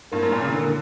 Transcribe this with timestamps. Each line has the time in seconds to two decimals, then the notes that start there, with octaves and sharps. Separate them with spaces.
0.12 G2 A#3 E4 A#4
0.22 F#2
0.32 A#2
0.42 C#3
0.52 D3 A#3 E4 A#4